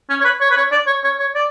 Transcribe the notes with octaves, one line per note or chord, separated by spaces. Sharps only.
C#4
C#5
B4
C#5
B4
C#5
D5
C#5
C#5
C#5
D5